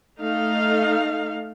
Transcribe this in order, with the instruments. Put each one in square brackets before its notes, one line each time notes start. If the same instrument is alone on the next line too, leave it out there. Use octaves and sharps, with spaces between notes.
[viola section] A3 D#4 F5